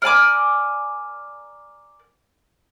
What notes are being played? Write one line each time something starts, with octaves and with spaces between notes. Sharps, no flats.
A#4 D5 G#5 D6